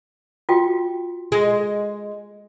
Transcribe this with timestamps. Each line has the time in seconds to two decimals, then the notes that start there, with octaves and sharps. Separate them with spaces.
0.49 F4 F#4 G5
1.32 G#3